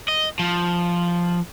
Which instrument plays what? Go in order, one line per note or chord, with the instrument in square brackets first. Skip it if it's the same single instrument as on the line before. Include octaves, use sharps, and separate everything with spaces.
[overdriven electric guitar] D#5
F3